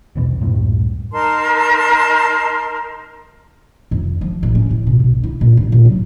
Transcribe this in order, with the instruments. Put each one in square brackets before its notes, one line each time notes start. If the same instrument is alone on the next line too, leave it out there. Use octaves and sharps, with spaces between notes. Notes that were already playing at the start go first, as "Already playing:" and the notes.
[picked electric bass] B1 E2 B2
C#2 F#2 A2 G3
[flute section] D#4 A#4 A5 C6
[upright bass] F2
F3
A1
C#4
A2
B2
A#1
E4
A#2
A1
A#2
F#3